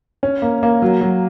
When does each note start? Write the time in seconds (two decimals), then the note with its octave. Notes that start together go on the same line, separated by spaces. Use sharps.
0.23 C#4
0.42 A#3
0.63 A#3
0.82 F#3
1.01 F#3